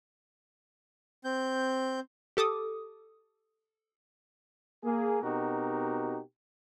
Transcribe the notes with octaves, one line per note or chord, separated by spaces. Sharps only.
C4 G6
G4 A4 D6 D#6
A#3 G#4
B2 C4 D#4 F#4 G4 A#4